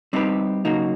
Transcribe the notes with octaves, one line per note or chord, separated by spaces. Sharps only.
G3 C4 D#4 G4 B4
C#3 F#3 A#3 D#4 F#4